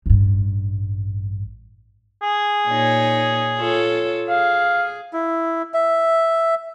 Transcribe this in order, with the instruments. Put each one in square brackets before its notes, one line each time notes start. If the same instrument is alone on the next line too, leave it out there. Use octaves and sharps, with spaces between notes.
[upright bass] A1 G2
[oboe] G#4
[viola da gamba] A#2 D#4 C#5
F4 A4 C#5
[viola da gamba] G#4 [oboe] F5
[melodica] E4
E5